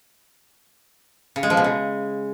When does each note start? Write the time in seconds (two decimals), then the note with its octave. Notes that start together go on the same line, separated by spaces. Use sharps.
1.36 C#3
1.43 G#3
1.50 F3
1.57 B2
1.64 C#3